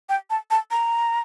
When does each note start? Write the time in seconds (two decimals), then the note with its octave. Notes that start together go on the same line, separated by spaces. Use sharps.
0.09 G5
0.30 A5
0.51 A5
0.71 A#5